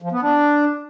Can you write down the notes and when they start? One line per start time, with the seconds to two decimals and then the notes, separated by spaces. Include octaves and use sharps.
0.02 F3
0.12 B3
0.22 D4